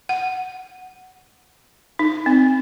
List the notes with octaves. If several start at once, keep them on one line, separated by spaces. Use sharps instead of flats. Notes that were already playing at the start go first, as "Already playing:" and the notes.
F#5
D#4
C4